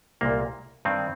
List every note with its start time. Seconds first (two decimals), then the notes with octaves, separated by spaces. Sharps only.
0.21 C2 A#2 A#3
0.85 G2 D#3 C4